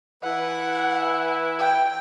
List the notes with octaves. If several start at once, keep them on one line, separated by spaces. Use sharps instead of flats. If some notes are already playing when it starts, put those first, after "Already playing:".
E3 E4 B4 F#5
G5